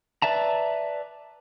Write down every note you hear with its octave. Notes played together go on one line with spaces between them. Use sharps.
B4 D5 E5 A5 A#5